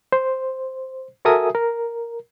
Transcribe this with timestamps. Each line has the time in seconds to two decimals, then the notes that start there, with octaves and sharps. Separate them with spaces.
0.12 C5
1.25 F#4 A4 A#4 E5 G#5 D#6
1.55 A#4